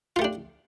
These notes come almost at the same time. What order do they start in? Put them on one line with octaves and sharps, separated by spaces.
F4 A3 G4 D4